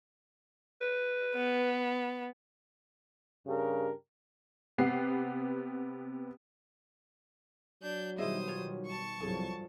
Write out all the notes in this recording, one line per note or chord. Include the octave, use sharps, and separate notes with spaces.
B4
B3
G2 C#3 D4 G4 A#4
C3 B3 G4 F#5 C7
F#3 D4 G6
B2 D#3 G3 E4 G#4 C5 D#5 D#6
F4 C#5
A5 C#6
C2 G2 F3 F#3 G#4 A4